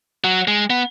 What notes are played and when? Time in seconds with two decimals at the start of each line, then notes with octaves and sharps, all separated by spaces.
0.24 F#3
0.48 G#3
0.70 B3